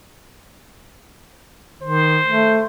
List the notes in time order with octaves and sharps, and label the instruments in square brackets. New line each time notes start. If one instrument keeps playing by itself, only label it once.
[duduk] D#3 [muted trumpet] C5
[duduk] A3